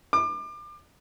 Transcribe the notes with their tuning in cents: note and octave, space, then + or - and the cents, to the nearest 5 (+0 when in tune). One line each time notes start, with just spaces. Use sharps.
D6 +30